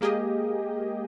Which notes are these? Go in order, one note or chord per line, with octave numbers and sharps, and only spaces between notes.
G#3 A#3 G4 G#4 D#5